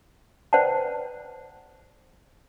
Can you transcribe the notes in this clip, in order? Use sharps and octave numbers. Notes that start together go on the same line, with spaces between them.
B4 C5 D5 F#5 G5 A5